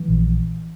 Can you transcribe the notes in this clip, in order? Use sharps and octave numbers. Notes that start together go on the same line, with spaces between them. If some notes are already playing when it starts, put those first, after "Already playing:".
Already playing: E3
A#1